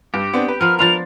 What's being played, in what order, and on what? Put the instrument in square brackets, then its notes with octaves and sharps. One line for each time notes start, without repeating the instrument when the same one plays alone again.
[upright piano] G2 [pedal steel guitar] G4
[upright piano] B3 C4 D4
B4
[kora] F3 B3 [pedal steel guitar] A#4 [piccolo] F6
[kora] F3 D4 F4 [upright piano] B5 F6 A6 [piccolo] F7